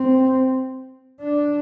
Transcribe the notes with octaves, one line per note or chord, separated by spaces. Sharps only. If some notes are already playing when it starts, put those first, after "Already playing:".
Already playing: C4
D4